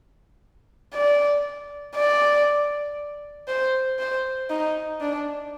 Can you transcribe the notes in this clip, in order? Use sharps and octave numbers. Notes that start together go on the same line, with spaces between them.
D5
D5
C5
C5
D#4
D4